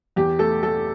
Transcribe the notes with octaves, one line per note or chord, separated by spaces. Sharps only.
E2 G4
A3 A4
A3 A4